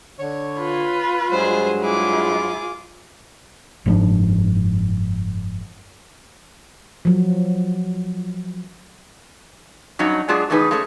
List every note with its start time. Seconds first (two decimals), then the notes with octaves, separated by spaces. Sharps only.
0.19 D3 C#5
0.59 F4 B4
1.31 G2 F#3 G#3 G#4 C5
1.81 E4 F4 G#4 D6
3.86 F#1 G#2 F3 D4
7.05 F3 F#3
9.99 G2 F#3 C#4 D#4
10.28 F#3 G#3 D4 F4 G#4
10.50 E2 A2 C#3 D#4 G#4 B4
10.71 G#3 A3 C#4